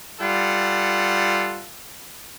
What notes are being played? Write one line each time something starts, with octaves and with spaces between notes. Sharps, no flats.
G3 F4 A4 F#5